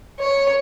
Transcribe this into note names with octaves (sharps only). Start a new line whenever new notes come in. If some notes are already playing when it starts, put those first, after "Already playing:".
C#5